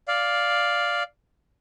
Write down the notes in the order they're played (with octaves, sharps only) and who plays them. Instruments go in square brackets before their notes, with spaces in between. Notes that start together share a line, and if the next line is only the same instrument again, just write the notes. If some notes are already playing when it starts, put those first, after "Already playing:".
[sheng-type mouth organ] D5 F5